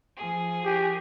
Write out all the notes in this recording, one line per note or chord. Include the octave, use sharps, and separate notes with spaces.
F3 G#4
G4